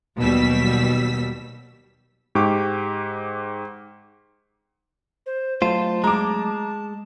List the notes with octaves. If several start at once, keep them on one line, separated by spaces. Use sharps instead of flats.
D#2 B2 F#3 G3 E6 B6
G#2 G4 C#6 D6
C5
F#3 A3 F4 C5 A5
G#3 A#5 D6